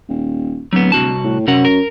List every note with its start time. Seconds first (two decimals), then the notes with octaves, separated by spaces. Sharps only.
0.09 D#1
0.73 D1 F#3 B3
0.92 C2 F#4 A5
1.24 A2
1.47 F#2 C3 A#4 F#5
1.65 A#4